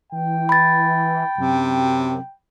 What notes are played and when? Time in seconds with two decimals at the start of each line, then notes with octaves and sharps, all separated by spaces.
0.12 E3 G5
0.49 B5 A6
1.38 F#2 C3